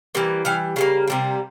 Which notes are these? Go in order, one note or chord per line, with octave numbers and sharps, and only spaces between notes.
E3 G3 A#3
E3 G3 F5
C#3 G3 A#3 F5
C3 G3 A#3